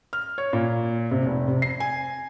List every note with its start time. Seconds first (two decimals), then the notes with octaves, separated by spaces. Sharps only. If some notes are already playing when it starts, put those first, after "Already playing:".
0.13 F6
0.38 C#5
0.53 A#2
1.11 C3
1.26 F1
1.48 C3
1.62 C7
1.80 G#5